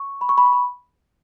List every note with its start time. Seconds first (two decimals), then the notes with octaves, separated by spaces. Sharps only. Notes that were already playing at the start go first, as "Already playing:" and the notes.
Already playing: C#6
0.21 B5
0.29 C#6
0.38 B5
0.46 C#6
0.53 B5